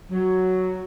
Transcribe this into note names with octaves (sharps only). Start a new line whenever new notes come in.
F#3